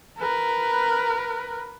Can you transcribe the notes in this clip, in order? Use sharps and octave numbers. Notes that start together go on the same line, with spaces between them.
A#4 B4